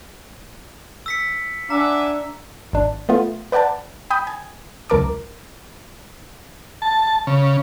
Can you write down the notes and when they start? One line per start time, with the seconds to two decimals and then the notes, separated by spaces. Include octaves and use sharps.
1.06 E6 B6 C#7
1.70 D4 E5 F#5 G#5 A#5 D6
2.73 G#1 D4
3.09 A3 B3 F4
3.52 B4 D5 F#5 G5 A5
4.10 G5 B5 D#6 G6
4.27 G#5
4.90 C#2 F#2 A#4 A5 D6
6.82 A5
7.27 C#3